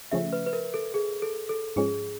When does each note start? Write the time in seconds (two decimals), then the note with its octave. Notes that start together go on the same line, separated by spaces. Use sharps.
0.12 C#3 F3 A3 C#4 E5
0.33 B4
0.46 B4
0.53 A#4
0.74 A4
0.94 G#4
1.22 A4
1.49 A4
1.76 G#2 F3 G#3 C#4 G#4